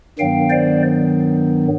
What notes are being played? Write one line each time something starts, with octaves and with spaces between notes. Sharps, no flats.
G2 D#3 F#3 B3 F5 G5
C5 D5